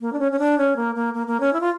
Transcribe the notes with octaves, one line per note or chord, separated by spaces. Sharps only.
A#3
D4
C#4
C#4
D4
C#4
A#3
A#3
A#3
A#3
C#4
E4
F4